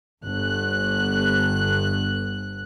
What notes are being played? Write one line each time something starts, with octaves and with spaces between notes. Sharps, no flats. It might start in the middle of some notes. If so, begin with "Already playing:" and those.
G1 F#6